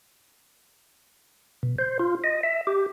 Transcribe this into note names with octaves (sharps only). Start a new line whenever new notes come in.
B2
C5
F4
D#5
E5
G4